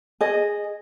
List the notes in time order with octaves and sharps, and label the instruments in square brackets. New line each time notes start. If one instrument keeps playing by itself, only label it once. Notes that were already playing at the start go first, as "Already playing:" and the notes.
[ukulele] G#4 D#5